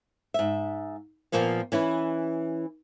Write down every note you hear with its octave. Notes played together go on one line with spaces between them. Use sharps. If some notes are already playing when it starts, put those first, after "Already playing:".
G#2 E5
A#2 F3 A#3 B3
E3 C#4 E4 B4